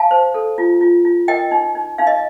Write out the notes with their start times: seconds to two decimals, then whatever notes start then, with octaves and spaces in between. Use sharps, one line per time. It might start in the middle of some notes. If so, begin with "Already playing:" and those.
Already playing: F5 A5
0.11 C5
0.34 A4
0.58 F4
0.81 F4
1.05 F4
1.28 A#4 D#5 G5
1.51 D#4
1.75 D#4
1.98 D#4 F5
2.07 D#5